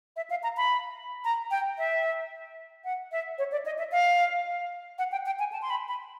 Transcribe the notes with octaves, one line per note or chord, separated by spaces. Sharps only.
E5
F5
A#5
B5
A#5
G5
E5
F#5
E5
C#5
D5
D#5
E5
F5
F#5
G5
G5
G#5
A5
C6
B5
B5